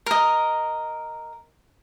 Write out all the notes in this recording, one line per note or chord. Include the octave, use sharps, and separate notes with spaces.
A#4 D#5